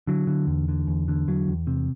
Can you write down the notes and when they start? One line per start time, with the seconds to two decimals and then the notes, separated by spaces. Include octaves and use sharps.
0.07 D3 F#3
0.27 D3
0.47 E2
0.68 D3
0.87 E2
1.08 D3
1.28 E2 F#3
1.48 E2
1.67 C3